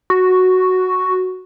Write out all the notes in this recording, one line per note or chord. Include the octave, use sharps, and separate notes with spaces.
F#4